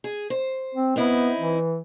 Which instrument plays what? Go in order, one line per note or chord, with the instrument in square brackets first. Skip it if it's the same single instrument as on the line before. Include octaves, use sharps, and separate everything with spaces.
[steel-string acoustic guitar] G#4
C5
[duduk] C4
[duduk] B3 [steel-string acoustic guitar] C4 D#4 E4
[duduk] E3